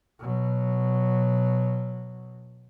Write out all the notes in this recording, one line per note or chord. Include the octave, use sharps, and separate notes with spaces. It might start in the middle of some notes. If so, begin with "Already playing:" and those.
B2 F#3